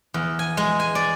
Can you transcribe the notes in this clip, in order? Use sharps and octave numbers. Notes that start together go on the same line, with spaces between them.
E2
G#5
G#3
G#5
D5